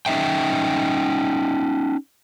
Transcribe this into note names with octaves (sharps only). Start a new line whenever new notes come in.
C#4 D#4 D#5 E5 G5